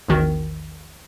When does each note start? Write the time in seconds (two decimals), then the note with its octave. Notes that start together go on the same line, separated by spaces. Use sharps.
0.08 A#1 E2 D#3 F#4